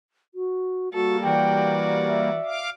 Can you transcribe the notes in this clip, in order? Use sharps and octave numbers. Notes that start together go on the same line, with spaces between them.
F#4
G3 A#3 F#4 A4
E3 F#4 D5 G5
E5
F5 D6